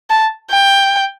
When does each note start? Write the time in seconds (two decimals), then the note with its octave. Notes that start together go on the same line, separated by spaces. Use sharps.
0.10 A5
0.51 G5